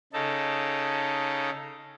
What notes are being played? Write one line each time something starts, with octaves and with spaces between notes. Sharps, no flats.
C#3 D#4 A4